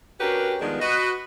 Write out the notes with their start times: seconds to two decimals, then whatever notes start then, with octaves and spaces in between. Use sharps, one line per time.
0.20 C#4 D4 F#4 G4 A#4 B4
0.61 D#3 F3 G3 G#3 B3 D4
0.80 F#4 B4 D#5